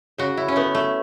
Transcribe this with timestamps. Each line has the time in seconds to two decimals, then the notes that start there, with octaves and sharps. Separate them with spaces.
0.18 C#3 F#4
0.37 E4
0.48 C#4
0.56 A3 B3
0.75 A3